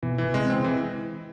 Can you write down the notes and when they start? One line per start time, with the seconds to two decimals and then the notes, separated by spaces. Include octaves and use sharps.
0.03 B2 E3
0.18 E3
0.34 C3 G#3
0.49 C4
0.64 E3